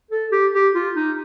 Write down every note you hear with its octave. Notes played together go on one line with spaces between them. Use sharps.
A4
G4
G4
F4
D#4